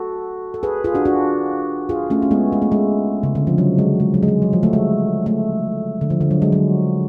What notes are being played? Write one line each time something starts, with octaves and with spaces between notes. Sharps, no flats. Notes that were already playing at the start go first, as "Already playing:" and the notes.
Already playing: F#4 A4
A4
G#4 B4
F4 G#4
D4 F#4
D4 F#4
F4 G#4
A3 C#4
C#4
G#3 B3
G#3
A3
G#3
C#3
D3
F3
F#3
G#3
G#3
F#3
G#3
F#3
F#3
F3
A3
G#3
A3
D3
F3
D3
F#3
G#3
F#3